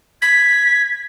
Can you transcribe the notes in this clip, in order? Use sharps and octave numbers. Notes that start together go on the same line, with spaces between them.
G#6 B6